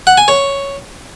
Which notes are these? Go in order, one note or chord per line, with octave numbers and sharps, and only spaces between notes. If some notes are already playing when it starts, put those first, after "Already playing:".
F#5
G#5
C#5